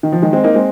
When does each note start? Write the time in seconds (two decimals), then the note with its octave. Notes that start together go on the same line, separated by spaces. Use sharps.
0.03 D#3
0.12 F3
0.22 D#3 G#3
0.33 G#3 C4
0.44 A#3 D#4
0.54 G#3 C4